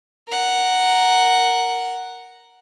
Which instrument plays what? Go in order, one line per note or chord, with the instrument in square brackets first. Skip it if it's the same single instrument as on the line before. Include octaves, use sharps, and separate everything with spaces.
[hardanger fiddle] A#4 F#5